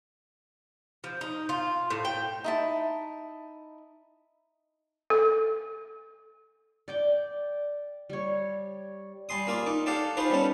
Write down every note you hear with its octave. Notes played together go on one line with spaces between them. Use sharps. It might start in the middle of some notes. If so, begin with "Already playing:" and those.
F3
D#4
F4
A2
G5
D#4 E4 A5
A4
D5 G5 D6
G3 C#5
G3 G#5 C6 D#6
A#3 F4 G#4 D5
D#4 D6
G4 A4 D5 F5 F#5
D#4 F4 G#4 B4 C5
G3 B3 C#4 A4